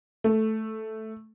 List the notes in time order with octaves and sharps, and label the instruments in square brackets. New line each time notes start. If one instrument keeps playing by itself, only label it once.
[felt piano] A3